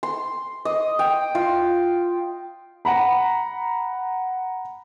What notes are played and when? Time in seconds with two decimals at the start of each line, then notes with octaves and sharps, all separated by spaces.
0.03 C6
0.65 D#5
0.99 G5
1.35 F4
2.85 F#5 A#5 B5